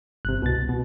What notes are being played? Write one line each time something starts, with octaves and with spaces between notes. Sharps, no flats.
G1 C3 F#6
C2 B2 A6
B2